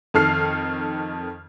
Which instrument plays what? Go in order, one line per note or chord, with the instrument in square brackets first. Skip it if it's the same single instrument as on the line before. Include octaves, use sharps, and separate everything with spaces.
[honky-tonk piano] F2 D#3 A4 F6 C7